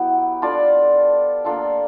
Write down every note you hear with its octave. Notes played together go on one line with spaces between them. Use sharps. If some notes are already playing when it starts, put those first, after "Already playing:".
Already playing: F#3 B3 E4 G4
D4 F4 A4 D5
A#3 D4 F4 A4